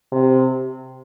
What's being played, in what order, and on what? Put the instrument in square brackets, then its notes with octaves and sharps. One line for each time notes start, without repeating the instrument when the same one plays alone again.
[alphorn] C3